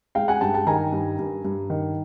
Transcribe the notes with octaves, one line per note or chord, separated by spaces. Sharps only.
G#3 F5 G5
F#5 G#5
G2 G5 A5
G5 A5
D#3 G#5 A#5
G2
G2
G2
D#3